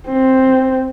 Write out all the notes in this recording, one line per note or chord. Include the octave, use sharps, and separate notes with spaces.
C4